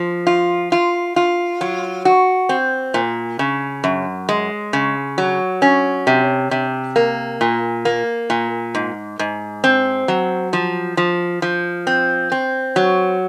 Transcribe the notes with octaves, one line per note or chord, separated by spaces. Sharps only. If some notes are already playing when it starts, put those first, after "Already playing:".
Already playing: F3
F4
F4
F4
F#3
F#4
C4
A#2
C#3
F#2
G#3
C#3
F#3
C#4
C3
C3
A#3
A#2
A#3
A#2
G#2
G#2
C4
F#3
F3
F3
F3
C4
C4
F#3